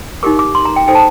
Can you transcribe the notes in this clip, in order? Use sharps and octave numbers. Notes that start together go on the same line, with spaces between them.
D#4 G4 A#4 D6
D6
C6
A#5
G5
D#4 A4 C5 G5
A5